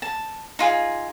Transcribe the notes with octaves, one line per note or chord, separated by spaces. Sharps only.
A5
D#4 F4 G#4